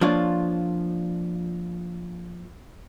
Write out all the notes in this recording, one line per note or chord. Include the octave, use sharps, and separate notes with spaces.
F3 A#3 D4 F4 C#5